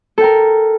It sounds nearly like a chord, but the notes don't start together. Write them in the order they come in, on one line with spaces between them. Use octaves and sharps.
A4 G5 A#4